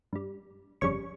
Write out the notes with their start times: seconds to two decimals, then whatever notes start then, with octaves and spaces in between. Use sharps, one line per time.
0.13 G2 G3
0.81 G1 F2 C#3 G3 C#5 C#6